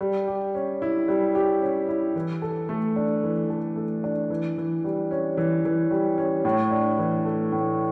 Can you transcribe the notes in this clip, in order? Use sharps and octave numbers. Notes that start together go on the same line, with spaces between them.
G3
G4
C#4
E4
G3
G4
C#4
E4
E3
A4
A3
D4
E3
A4
A3
D4
E3
E3
G3
C#4
E3
E3
G3
C#4
A2
D4
E3
A3
A2